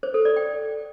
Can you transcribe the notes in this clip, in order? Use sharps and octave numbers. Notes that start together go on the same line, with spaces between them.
C5
A4
D5
G5